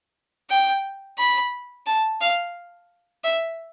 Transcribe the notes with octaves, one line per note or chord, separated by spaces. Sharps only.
G5
B5
A5
F5
E5